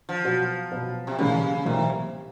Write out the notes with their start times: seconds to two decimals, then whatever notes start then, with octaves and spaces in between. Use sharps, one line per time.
0.09 F3
0.24 B2 F#3 B3
0.71 B2 F#3 B3
1.07 C3
1.18 B1 A2 C#3 E3 G3 A#3
1.65 B1 A2 C3 E3 G3 A#3